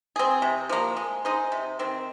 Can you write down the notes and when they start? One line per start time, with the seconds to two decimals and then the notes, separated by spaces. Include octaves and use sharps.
0.16 C4 G#4
0.42 C3
0.69 F3 A#3
0.97 G#3
1.25 D#4 G#4 C5
1.52 C3
1.79 D#3 C4